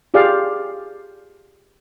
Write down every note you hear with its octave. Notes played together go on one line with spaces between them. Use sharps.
F4 G4 G#4 D5 F5